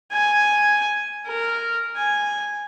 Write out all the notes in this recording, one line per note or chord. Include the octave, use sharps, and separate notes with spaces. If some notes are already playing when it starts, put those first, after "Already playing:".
G#5
A#4
G#5